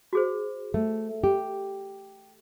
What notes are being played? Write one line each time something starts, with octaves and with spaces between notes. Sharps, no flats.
F#4 G#4 C5
A3
G4